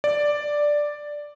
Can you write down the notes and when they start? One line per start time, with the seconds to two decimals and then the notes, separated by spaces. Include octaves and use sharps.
0.04 D5